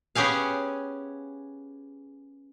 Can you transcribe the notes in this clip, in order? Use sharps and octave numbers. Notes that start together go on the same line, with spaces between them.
B3 C#4 G4 G#4 F5